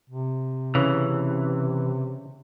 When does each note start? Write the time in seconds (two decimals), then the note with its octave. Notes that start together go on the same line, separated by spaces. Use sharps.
0.10 C3
0.75 C#3 E3